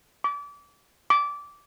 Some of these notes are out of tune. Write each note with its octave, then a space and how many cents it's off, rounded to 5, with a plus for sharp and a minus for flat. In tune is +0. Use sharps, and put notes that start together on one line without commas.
D6 -30
D6 -15